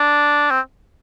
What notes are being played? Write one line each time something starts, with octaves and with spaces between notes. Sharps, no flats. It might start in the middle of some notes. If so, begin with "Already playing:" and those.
Already playing: D4
C4